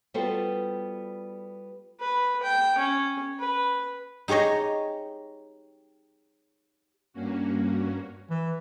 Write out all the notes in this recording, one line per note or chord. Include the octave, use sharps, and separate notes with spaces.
G3 B3 F4 F#4 A4 C5
B4
G5
C#4
B4
D#4 G4 G#4 C#5 D#5
G2 A#3 C#4 F#4
E3